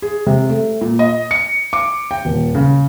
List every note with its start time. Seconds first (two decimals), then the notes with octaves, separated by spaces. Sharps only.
0.02 G#4
0.27 C3
0.50 A3
0.81 A#2
0.99 D#5
1.31 C#7
1.73 D6
2.11 G5
2.25 D#1
2.55 C#3